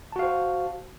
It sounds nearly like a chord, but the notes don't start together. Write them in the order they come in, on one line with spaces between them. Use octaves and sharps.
A5 F#4 F5 C5